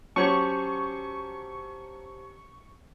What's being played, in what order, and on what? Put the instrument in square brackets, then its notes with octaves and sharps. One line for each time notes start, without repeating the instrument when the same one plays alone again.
[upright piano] F#3 C#4 [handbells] G4 C5 A5 [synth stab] C#6